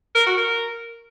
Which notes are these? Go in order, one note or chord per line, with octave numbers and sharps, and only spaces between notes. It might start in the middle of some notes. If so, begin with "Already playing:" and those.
A#4
F#4
A#4